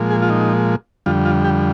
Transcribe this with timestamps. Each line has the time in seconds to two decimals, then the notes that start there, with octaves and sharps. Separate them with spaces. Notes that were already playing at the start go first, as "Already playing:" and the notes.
Already playing: A#2 F3 G#3
0.11 G#4
0.22 F4
0.30 D#4
1.06 F2 D3 G3 F4
1.25 F4
1.44 G4